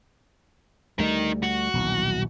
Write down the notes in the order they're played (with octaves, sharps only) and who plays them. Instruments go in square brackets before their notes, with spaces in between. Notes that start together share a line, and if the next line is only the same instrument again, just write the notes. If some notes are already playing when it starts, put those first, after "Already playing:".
[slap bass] D2 G3 A3 [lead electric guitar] D#4 A#4
[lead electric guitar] F#4
[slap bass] D#1 B1 E3